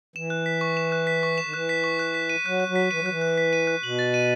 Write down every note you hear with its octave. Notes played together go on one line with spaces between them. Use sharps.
E3 E7
F#6
B6
C#6
E7
F#6
B6
C#6
E7
D#3
E3 F#6
B6
C#6
F#6
B6
D#7
F#3 F#6
F#6
F#3
B6
E3 D#7
F#3
E3 F#6
F#6
B6
D#7
F#6
B2 F#7
A6
D#7